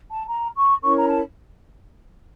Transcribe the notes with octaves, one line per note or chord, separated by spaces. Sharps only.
A5
A#5
C#6
C#4 E4 A#4 C#5 C#6
A#5
A5